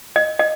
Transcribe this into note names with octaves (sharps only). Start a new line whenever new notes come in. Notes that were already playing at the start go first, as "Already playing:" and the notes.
D#5
D#5